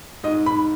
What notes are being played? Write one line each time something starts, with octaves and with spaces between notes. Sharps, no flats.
G#2 D#5
G#2 B5